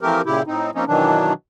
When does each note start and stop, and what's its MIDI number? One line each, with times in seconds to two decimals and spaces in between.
0.01 0.22 52
0.01 0.22 53
0.01 0.22 57
0.01 0.22 60
0.01 0.22 67
0.01 0.22 70
0.26 0.42 46
0.26 0.42 49
0.26 0.42 64
0.26 0.42 67
0.47 0.71 45
0.47 0.71 60
0.47 0.71 63
0.75 0.85 53
0.75 0.85 58
0.75 0.85 60
0.75 0.85 61
0.75 0.85 63
0.88 1.33 47
0.88 1.33 51
0.88 1.33 52
0.88 1.33 54
0.88 1.33 62